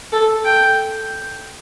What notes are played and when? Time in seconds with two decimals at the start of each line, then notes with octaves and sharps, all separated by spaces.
0.12 A4
0.45 G5